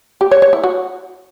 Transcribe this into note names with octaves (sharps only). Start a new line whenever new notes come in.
G4
C#5
C#5
E4
F#4